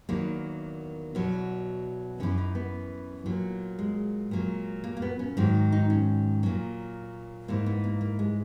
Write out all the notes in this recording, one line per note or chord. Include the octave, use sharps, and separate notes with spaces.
E2 D#3 F#3 A#3
E2 B2 F#3
F#2 E3 C#4
D#4
B3
A#2 F#3
G#3
A#2 F#3
A#3
A#3
B3
C#4
G#2 D#3 F#3
D#4
C#4
A#2 F#3
G#2 E3 A#3
B3
A#3
A#3
G#3